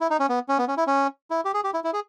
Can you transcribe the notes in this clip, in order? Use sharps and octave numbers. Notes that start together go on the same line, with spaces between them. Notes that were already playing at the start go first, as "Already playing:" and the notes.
E4
D#4
C#4
B3
C#4
B3
C#4
E4
C#4
E4
G4
G#4
G4
E4
E4
G#4